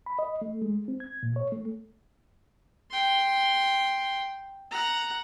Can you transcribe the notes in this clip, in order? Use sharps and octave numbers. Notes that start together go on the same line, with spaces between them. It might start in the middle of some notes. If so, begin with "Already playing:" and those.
B5
D#5
A3
G#3
C4
G#6
A#2
C#5
A3
G5 C6
F#5 A#5